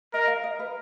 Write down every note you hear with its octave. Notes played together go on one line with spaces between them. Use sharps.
A#4 D#5
F5
D#5
B4